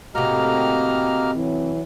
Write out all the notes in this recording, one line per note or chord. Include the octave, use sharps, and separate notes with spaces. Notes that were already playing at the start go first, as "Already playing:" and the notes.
A2 C3 A#3 F#4 G4 D#5 A#5 F6
E3 F#3